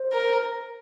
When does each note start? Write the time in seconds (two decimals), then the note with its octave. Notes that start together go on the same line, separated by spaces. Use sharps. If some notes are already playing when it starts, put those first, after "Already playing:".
Already playing: C5
0.13 A#4